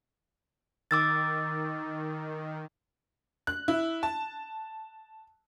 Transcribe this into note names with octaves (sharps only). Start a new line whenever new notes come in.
D#3 D6 E6 A6
F#6
E4
A5